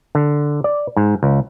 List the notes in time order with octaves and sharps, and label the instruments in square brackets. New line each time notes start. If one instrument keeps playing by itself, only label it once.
[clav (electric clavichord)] D3
D5
G#2
C#2